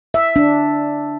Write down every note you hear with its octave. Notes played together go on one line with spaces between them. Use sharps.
E5
D4